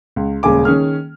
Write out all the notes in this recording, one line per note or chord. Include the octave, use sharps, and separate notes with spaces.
C#2
D#1 C#3 G#3 G#5 D6
D#3 C#4 G#4 F6